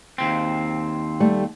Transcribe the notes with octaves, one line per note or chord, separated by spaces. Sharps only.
D#2 C4
G3 A3